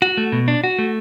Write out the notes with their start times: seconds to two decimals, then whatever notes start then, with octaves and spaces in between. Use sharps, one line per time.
0.02 F#4
0.17 A3
0.32 B2
0.48 D4
0.64 F#4
0.79 A3